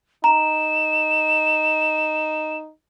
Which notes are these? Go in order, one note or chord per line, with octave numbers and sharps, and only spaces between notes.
D#4 A#5 E7